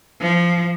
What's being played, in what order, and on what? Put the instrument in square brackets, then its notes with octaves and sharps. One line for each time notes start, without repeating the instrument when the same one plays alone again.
[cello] F3